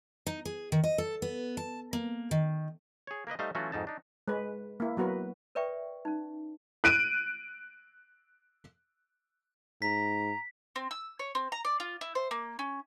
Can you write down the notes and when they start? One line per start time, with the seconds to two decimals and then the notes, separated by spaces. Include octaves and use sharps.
0.27 D#4
0.45 G#4
0.72 D#3
0.84 D#5
0.98 A4
1.22 B3
1.57 A5
1.93 A#3
2.31 D#3
3.07 G#4 C#5
3.27 A#3 A#4 B4 D#5
3.39 G3 A3 D#4 C5 D#5 F5
3.55 E3 F#3 A3 C#4 F4 F#4
3.72 F2 G#2 D#4 A5
3.87 D4 D#4
4.28 G#3 B4
4.80 A#3 E4
4.97 F#3 B3 F#4 A#4 B4
5.55 A#4 B4 D5 E5 G5 C#6
6.05 C#4 D#4
6.84 F#6 D7 D#7
9.82 G#2 A#5 B6
10.76 C4
10.91 E6
11.19 C#5
11.35 C4
11.52 A#5
11.65 D5
11.80 F4
12.01 E4
12.15 C5
12.31 A#3
12.59 C#4